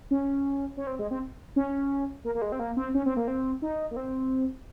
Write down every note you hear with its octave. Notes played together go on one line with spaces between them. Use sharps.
C#4
C#4
C4
G#3
C4
C#4
A#3
A#3
G#3
C4
A#3
C4
C#4
C4
A#3
C4
D#4
A#3
C4